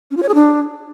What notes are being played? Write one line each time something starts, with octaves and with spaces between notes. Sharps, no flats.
C#4
F4
C#5
G#4
D4